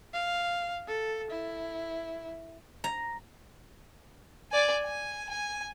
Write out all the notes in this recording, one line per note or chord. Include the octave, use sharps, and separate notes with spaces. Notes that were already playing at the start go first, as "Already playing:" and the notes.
F5
A4
E4
A#5
D5 G#5
G#5
G#5